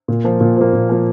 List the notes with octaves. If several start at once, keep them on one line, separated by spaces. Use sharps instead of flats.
A#2
F3 A#3
A#2
F3 A#3
A#2
F3 A#3